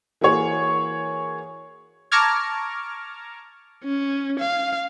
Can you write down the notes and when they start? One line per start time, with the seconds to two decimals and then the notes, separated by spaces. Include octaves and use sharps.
0.21 E3 A#3 F#4 G#4 C#5
2.12 A5 A#5 C#6 D6 F6 G#6
3.84 C#4
4.40 F5